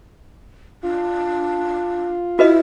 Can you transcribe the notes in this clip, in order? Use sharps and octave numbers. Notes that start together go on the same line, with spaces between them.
D4 F4
E4 F#4 B4 D#5